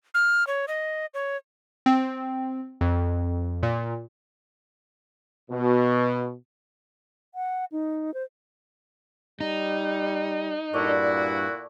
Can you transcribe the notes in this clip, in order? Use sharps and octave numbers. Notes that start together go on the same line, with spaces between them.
F6
C#5
D#5
C#5
C4
F2
A#2
B2
F#5
D#4
C5
G3 D#4
G2 A#2 A3 E4 F#4 D5